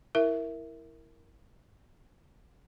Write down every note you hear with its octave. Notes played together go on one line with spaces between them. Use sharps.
E4 A#4 E5